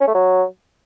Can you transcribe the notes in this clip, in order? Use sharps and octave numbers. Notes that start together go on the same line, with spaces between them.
C#4
A3
F#3